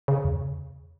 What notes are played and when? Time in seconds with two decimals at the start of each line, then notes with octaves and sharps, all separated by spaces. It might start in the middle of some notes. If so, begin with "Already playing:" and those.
0.08 C#3
0.25 E2